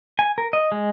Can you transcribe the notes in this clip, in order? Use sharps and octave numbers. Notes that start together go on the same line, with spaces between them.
G#5
A#4
D#5
G#3